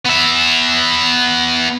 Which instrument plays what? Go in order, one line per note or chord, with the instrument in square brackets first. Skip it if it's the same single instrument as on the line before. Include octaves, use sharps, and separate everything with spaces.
[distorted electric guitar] B3 E5